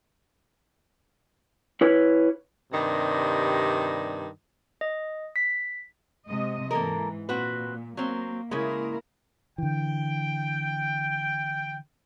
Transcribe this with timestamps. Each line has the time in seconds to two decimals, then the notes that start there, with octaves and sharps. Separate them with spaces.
1.81 E4 B4 C#5
2.73 G2 C3 D#3 G3
4.81 D#5
5.36 B6
6.27 C3 G#3 D#5
6.71 G#2 E3 A#3 A4 A#4
7.29 A#2 C4 F#4 B4
7.97 F#3 A#3 C4
8.51 C#3 G#3 A#3 E4 A#4
9.58 D3 E3 G5